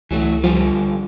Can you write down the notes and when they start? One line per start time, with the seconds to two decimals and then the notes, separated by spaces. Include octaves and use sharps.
0.11 C#2 E3 F#3 A3
0.44 D3 F3 G3 F4